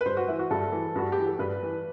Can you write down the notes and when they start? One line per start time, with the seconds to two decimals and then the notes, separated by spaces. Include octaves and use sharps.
0.01 B4
0.05 G2 C5
0.17 F#4
0.28 E3 E4
0.39 F#4
0.50 G2 A4
0.72 E3
0.96 G2 F#4
1.12 G4
1.18 E3
1.27 A4
1.39 G2 B4
1.62 E3